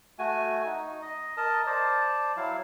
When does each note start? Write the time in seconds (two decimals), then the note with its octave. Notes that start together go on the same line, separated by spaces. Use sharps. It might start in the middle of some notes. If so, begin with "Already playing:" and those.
0.19 A3 F#4 G#5
0.66 D#4
1.02 D#5
1.37 A#4 D#5 A5
1.67 C5 D5 A5
2.37 F#3 E4 F5